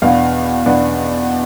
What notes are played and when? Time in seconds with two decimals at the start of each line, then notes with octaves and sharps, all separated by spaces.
0.02 E2 B2 B3 D4 F5
0.66 E2 B2 B3 D4